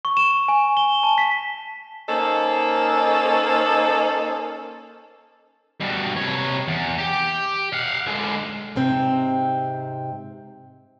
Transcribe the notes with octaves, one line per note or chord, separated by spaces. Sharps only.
C#6
E7
G#5
G7
A5
B6
A#3 C#4 D#4 A4 C5 D#5
G2 B2
C3 C#5
E2
G4
F5 F#5
D3 G#3
G#2 C3 C4